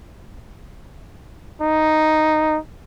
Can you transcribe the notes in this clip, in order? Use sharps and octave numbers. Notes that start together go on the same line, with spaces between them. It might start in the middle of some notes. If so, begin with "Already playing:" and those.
D#4